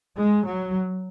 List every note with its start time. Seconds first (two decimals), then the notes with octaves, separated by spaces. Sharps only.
0.17 G#3
0.45 F#3